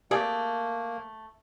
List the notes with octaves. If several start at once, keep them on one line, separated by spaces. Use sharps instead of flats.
A3 A#3 G4 G#4 D5